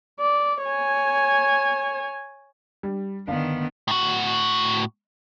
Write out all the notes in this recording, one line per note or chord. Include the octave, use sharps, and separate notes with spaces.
D5
C#5 G#5
G3
G1 D#3 B3 D4 F5
A2 F#4